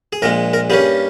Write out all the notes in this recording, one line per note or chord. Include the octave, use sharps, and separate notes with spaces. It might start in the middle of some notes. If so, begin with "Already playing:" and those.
G#4
A#1 A#2 G#3 A#4
A#4
G2 G3 A#3 C#4 G#4